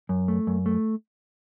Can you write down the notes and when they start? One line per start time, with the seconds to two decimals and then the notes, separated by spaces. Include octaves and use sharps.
0.09 F#2
0.28 A3
0.47 F#2
0.66 A3